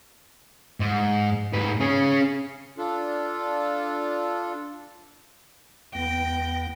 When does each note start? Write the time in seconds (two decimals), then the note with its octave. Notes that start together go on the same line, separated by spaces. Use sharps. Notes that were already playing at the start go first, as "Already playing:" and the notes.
0.80 G#2
1.53 G#2 B4
1.80 C#4 G#4
2.78 D4 F4 A4
5.95 E2 B3 G5 A#6